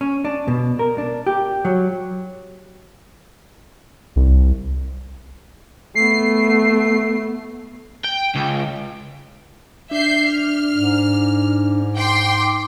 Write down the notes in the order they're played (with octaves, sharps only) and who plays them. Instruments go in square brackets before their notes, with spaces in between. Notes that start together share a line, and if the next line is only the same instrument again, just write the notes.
[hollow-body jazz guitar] C#4
D4
B2
A#4
D4
G4
F#3
[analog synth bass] C2
[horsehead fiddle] A3 B3 [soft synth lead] C7
[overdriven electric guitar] G5
C#2
[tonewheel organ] D4 [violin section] E5 G6 C7
[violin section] F6
[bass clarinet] G#2
[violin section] G5 C6 [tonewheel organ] D6